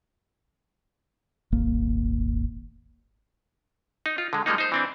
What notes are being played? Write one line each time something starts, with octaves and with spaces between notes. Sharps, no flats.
D#1 G#1 A#3
D#4
F4
D3 G#3
F3 G3 G#3 A#3 D#4
D#4 C5
E3 C4 D4